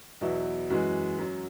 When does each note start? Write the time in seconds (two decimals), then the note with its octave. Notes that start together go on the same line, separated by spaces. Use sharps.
0.21 E2 B2 F#3 E4
0.70 F#2 E3 G#3 F#4
1.18 F#2 F#3